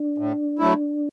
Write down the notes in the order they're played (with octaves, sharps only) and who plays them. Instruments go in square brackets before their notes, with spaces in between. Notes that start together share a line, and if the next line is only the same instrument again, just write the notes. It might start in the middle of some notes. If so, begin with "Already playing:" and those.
Already playing: [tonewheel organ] D4
[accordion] A2
F#3 A3 E4